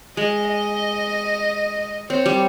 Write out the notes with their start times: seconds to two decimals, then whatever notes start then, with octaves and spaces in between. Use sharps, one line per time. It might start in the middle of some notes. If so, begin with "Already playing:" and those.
0.17 G#3 D#5
0.49 D#5
2.10 C4 C#5
2.26 G3